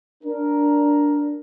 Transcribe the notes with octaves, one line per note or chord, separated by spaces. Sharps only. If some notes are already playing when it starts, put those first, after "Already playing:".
D4 A#4